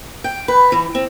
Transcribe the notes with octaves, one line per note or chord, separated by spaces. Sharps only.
G5
B4
E3
C4